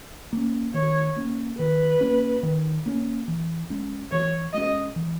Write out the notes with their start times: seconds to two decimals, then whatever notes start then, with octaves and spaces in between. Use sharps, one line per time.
0.33 A#3 C#4
0.74 D#3 C#5
1.16 A#3 C#4
1.58 D#3 B4
2.01 A#3 C#4
2.43 D#3
2.86 A#3 C#4
3.28 E3
3.70 G#3 C#4
4.11 E3 C#5
4.54 G#3 C#4 D#5
4.96 E3